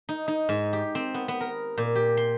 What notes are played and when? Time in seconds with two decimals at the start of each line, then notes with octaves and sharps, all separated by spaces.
0.09 D#4
0.28 D#4
0.49 G#2
0.73 G4
0.95 C4
1.14 B3
1.28 B3
1.41 A#4
1.78 A#2
1.95 G4
2.17 C6